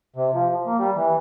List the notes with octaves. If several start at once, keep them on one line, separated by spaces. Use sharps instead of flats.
C3
F3
A#3
G3
E3